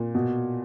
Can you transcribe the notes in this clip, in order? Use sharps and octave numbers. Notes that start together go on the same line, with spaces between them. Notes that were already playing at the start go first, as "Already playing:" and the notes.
Already playing: A#2
B2